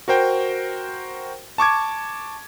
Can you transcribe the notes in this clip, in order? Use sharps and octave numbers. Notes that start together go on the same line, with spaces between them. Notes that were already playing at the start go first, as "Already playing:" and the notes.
F#4 A#4 C5 G5
A5 C#6 D6 G#6